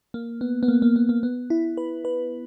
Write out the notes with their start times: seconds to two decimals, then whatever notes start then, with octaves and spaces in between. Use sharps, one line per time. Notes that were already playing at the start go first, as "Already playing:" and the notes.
0.14 A#3
0.41 B3
0.63 B3
0.68 A#3
0.82 A#3
0.96 B3
1.09 A#3
1.23 B3
1.50 E4
1.77 B4
2.05 B4